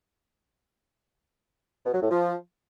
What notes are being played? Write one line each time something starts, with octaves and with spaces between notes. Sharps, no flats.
B2
F#3
A2
F3